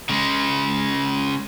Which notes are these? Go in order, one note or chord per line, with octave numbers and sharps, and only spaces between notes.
C#3 G#3